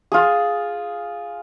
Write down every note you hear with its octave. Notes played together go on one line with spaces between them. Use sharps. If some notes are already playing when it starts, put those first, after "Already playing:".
F4 G#4